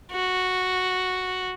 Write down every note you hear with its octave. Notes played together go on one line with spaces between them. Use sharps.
F#4